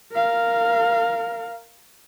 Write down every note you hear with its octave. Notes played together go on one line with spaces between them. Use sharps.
A#4 F5